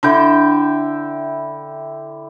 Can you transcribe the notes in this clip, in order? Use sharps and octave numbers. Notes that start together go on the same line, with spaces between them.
D3 E4 G5